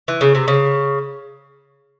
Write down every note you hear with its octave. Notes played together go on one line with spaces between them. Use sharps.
E3
C#3
C3
C#3